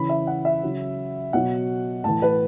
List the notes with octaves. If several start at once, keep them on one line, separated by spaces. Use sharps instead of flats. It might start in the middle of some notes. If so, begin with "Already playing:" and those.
Already playing: C#3 E3 B5
E5
F#5
E5
C#3 F#3
B2 F#3 F#5
A2 E3 A5
B4